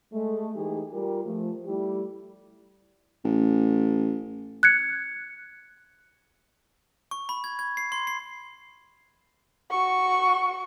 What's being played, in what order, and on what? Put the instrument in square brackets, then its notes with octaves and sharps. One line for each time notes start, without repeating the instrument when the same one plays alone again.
[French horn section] G#3 A3
E3 A3 D#4 G4 G#4
G3 F4 G4 A#4
F3 A3
G3 A3 E4 G4
[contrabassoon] A1
[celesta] F#6 G#6 C#7
[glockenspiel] C#6
B5
G#6
G#6
C7
C6
C7
[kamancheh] F#4 C#6